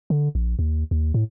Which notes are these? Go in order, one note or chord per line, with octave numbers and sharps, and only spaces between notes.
D3
A#1
D#2
D#2
A2